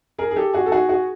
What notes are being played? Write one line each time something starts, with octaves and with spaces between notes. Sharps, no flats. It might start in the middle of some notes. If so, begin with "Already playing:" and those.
G#4 A#4
G#4
G4 A4
F#4 G#4
A4
F#4 G#4
F#4 G#4